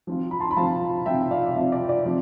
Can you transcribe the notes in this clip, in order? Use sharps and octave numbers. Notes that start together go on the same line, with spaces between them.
F3 C4 F4
B5
A5 C6
B5
F3 C4 F4 F5 A5
F3 C4 F4 E5 G5
D5 F5
D5
F3 C4 F4 E5
D5
D5
F3 C4 F4